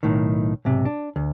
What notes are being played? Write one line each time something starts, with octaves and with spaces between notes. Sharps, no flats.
B1 A2 D#3
B1 G#2 C3
D4
D2